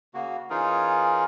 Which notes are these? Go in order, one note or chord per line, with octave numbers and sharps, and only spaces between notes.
C#3 A#3 F#4
E3 C#4 D#4 F4 G#4 A#4